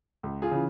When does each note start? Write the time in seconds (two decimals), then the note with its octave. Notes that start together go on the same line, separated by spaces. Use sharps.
0.23 C#2
0.42 F4 G#4
0.51 C#3 E3